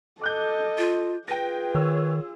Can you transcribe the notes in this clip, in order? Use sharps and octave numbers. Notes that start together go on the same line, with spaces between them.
A4 D#5 D6 F#6 G6
F4
F4 G#4 B4 G5 A#6
D#3 C#5 E6